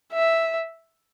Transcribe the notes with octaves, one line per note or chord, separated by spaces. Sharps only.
E5